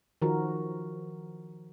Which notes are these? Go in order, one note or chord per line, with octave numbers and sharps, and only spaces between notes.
D#3 F3 F#4 A#4